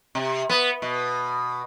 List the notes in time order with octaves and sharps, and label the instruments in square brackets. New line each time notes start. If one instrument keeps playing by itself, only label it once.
[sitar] C3
B3
B2